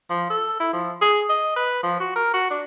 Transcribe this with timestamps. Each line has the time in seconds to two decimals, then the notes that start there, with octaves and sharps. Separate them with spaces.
0.10 F3
0.30 A4
0.60 E4
0.73 F3
1.02 G#4
1.29 D#5
1.56 B4
1.83 F3
2.00 F#4
2.16 A#4
2.34 F#4
2.51 D4